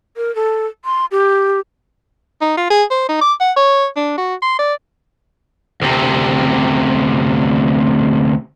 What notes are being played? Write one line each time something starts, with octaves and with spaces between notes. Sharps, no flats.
A#4
A4
C6
G4
D#4
F4
G#4
C5
D#4
D6
F#5
C#5
D4
F#4
C6
D5
D2 C3